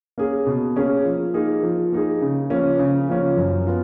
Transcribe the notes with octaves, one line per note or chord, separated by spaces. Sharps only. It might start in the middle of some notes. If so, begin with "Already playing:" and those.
A#3 C#4 G#4
B2
A#3 C#4 G#4
F3
A#3 D#4 G#4
F3
A#3 D#4 G#4
C#3
F3 A#3 C#4
C#3
F3 A#3 C#4
F#2
B3 F4